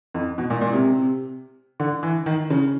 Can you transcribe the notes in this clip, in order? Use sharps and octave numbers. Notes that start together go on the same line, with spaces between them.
F2
B2
A#2
A#2
C3
D3
E3
D#3
C#3